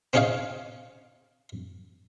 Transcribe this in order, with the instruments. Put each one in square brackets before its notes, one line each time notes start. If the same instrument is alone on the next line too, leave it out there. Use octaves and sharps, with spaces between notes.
[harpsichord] C4 C#4 D#4 G#4 C#5 F5